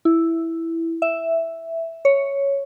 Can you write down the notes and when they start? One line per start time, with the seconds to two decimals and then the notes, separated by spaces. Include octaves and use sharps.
0.05 E4
1.02 E5
2.05 C#5